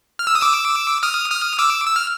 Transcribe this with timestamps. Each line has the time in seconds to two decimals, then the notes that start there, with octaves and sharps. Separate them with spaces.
0.19 F6
0.27 E6
0.35 D#6
0.42 D6 E6
1.03 D#6 F6
1.30 D#6 F6
1.59 D6 E6
1.87 E6
1.96 F6